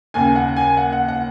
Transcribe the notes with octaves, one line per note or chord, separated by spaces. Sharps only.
D#2 C#3 G#5
F#5
G#5
F#5
F#5
F#5